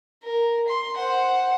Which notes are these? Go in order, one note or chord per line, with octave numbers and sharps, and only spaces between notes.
A#4
C6
C5 F#5